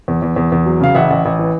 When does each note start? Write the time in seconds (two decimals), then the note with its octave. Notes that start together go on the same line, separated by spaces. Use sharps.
0.08 E2
0.22 E2
0.36 E2
0.52 E2
0.66 F#3
0.80 C#3 F5
0.95 A1 E5 F#5
1.10 A1
1.25 A1
1.39 E3